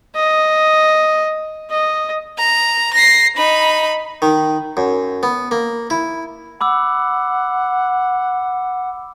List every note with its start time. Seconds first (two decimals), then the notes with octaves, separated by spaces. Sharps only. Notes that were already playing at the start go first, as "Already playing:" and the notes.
0.16 D#5
1.70 D#5
2.38 A#5
2.94 A#6 C7
3.37 D#4 B5
4.22 D#3
4.77 F#2
5.23 B3
5.51 A#3
5.90 E4
6.61 F#5 B5 D6 E6